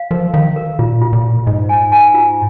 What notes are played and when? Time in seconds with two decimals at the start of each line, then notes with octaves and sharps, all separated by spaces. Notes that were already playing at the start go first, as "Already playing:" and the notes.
Already playing: F5
0.11 F3 A#4
0.33 D#3 F5
0.56 A#4
0.79 A#2 F4
1.02 F4
1.13 A#2
1.24 F4
1.46 G#2 D#5
1.69 G#5
1.92 G#5
2.14 F4